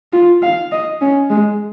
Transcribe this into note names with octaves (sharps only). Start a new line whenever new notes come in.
F4
F5
D#5
C#4
G#3